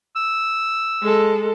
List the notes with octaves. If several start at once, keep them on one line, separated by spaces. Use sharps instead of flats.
E6
G#3 A4